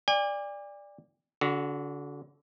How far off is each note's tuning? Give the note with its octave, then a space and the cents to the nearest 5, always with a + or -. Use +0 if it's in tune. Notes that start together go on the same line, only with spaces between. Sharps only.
D5 +0 G#5 -45
D3 -30 F#4 +0